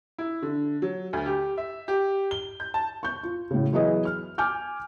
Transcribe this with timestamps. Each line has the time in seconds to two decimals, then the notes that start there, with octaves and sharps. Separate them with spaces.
0.18 E4
0.42 D3
0.82 F#3
1.13 D2
1.26 G4
1.58 E5
1.88 G4
2.31 G7
2.60 G6
2.74 A5
3.03 C#6 G6
3.23 F4
3.51 A2 C#3
3.73 E3 F#3 B3 E4 G#4 D#5
4.05 F6
4.38 G#5 D6 F6 G6